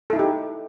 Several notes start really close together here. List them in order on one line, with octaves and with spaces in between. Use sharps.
A4 E4 D#4 G4